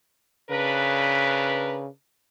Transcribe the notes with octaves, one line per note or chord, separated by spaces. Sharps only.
C#3 D4 A#4 B4